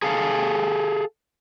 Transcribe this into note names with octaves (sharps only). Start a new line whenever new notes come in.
G#4 A4 F5